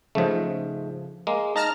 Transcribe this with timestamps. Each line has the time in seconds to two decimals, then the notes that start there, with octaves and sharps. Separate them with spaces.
0.15 G#2 C#3 F3 A3
1.27 G#3 A#3
1.56 D#4 A5 A#5 F6